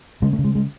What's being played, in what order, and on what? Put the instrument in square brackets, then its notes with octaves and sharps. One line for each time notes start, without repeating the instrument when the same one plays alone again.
[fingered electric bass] C#3 G#3
A3
C#3
G#3
G#3